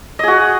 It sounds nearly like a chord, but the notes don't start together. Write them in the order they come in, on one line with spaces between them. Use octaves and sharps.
D#5 G#4 F#4